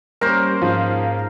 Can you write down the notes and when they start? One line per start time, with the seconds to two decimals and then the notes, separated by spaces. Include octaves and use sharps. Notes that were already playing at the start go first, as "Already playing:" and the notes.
0.21 G3 A#3 C#4 A#4 C5
0.62 G#2 F3 F5